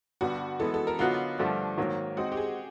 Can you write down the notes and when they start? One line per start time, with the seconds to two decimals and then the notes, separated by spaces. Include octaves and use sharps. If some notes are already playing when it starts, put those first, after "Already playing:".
0.21 G2 D3 G3 B3 D4 F#4
0.60 E3 G#3 B3 A4
0.74 A4
0.87 A#4
0.99 D3 F#3 B3 D#4 F4 F#4
1.39 G2 D3 F3 A3 D4
1.77 G#2 D#3 F#3 A#3
2.16 G#3 C4 D#4 F#4
2.32 G4
2.37 G#4